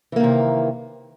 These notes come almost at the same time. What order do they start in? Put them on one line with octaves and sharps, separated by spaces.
E3 A#3 D#3 C3